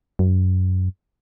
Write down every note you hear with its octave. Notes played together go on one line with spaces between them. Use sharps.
F#2